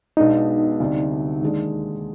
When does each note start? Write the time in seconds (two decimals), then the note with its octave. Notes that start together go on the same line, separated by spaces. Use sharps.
0.17 B1 B2 G#3 B3 D4 D#4
0.80 D2 C3 G3 D4
1.41 D#2 D#3 G#3 D4